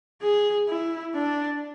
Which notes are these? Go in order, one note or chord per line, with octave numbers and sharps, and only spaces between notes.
G#4
E4
D4